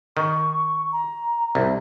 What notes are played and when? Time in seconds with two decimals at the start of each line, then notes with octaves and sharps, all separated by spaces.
0.17 D#3 C#6
0.92 A#5
1.55 C2